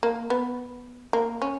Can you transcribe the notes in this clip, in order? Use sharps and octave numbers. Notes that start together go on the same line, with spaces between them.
A#3
B3
A#3
C#4